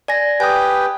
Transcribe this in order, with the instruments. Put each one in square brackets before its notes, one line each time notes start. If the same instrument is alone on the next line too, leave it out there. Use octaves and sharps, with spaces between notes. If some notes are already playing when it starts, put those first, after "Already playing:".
[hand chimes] D5 G#5 A#6
[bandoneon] G4 B4 G5 [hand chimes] G#5 D#6